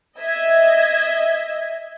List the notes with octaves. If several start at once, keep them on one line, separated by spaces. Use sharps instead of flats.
D#5 E5 G#6